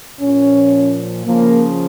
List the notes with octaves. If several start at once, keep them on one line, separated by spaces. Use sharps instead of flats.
A#2 F3 C#4
C#3 F3 A#3